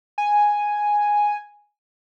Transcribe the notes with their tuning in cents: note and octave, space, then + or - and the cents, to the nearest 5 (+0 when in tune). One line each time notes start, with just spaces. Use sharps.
G#5 +0